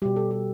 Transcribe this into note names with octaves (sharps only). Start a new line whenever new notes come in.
B2 G3 G4
A4
G4